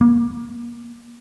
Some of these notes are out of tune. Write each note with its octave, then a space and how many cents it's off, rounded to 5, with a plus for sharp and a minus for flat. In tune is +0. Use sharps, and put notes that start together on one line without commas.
A#3 +30